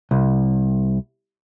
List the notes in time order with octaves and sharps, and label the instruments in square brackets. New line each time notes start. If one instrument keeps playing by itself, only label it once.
[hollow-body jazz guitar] C2